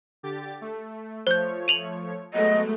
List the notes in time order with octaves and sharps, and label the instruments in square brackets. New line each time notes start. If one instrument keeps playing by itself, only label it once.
[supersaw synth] D3 G4 A6
A3
[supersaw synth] F3 A3 C#5 [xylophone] C5 G6
[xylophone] D#7 F7 F#7
[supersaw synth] F#3 B3 [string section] G#3 A3 [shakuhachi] D#5